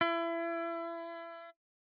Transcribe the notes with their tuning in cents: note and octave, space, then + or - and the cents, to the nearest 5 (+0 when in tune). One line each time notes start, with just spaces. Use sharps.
E4 +30